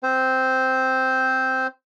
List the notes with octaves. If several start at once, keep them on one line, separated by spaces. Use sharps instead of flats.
C4 C5